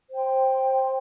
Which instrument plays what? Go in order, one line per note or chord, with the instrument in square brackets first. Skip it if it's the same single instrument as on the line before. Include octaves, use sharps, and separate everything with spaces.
[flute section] C5 G5 C6